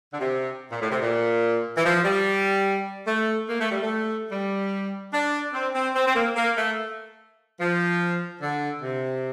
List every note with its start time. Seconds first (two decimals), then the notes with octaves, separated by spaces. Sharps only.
0.12 D3
0.20 C3
0.72 A#2
0.81 A2
0.91 C3
1.02 A#2
1.77 E3
1.84 F3
2.04 G3
3.07 A3
3.49 A#3
3.60 A3
3.71 G3
3.83 A3
4.31 G3
5.13 D4
5.53 C4
5.75 C4
5.95 C4
6.07 C4
6.15 A#3
6.36 A#3
6.56 A3
7.60 F3
8.41 D3
8.82 C3